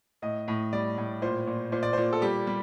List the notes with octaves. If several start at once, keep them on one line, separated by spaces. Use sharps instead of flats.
A2 D#5
A2
G3 D5
A2
A#2 C5
A#2
A#2 C5
D5
A#2 C5
A4
G3 G4
G3